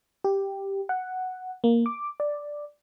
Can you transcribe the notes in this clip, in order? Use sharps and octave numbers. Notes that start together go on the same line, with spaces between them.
G4
F#5
A#3
D6
D5